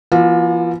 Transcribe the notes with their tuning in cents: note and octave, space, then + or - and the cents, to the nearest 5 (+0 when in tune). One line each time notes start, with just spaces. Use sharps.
F3 -45 B3 -40 F4 +35